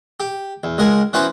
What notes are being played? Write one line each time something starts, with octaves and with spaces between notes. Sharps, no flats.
G4
E2
C#2 G#3 A#4 G#5
E3 B3 C#4 F#4 C5